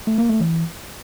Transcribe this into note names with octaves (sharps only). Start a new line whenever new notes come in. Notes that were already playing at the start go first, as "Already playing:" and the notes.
A3
A#3
A3
E3